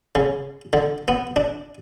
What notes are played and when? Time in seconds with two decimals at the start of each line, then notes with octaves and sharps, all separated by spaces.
0.15 C#3
0.73 D3
1.08 B3
1.36 D4